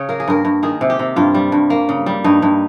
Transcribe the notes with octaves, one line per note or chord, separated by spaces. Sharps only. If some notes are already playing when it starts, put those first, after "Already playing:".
Already playing: C#3 C#5
A#3 A#4
G#4
G2 A#4
G2
D#3 G#4
C3
G4
C3
G2 F4
G3
G2
A#3
C#3
G3
G2 D#4
G2